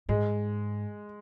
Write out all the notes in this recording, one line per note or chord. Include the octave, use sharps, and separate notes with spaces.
G#2 G#3